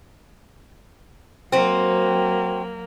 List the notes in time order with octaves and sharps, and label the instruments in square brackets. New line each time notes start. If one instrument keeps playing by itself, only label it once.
[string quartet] F#3 A#3 [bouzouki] C4 F#4